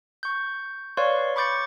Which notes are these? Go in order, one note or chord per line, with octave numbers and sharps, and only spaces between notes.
C#6 G6
B4 C#5 D5 F5 C6 C#6
B5 C#6 D6 G6 A6 C#7